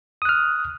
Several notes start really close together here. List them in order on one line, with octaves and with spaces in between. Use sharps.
D#6 F#6 F6